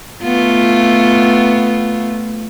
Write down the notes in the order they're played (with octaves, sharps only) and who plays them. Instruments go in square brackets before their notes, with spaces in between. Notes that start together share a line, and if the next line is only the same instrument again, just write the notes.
[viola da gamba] A3 B3 F4